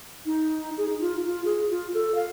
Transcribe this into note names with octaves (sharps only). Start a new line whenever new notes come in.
D#4
G#4
D#4
F4
F4
G#4
F4
A4
F5